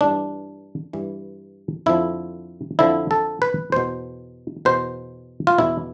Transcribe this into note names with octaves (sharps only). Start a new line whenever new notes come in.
G2 E3 D4
G2 E3
F2 D3 F3 E4
F2 D3 F3 E4
A4
B4
E2 B2 C5
E2 B2 C5
F4
E2 B2 E4